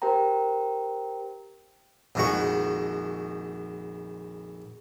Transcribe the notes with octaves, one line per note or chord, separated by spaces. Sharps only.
G4 A#4 C5 G5 A#5
A#1 F2 D#3 G#3 F#4 C#6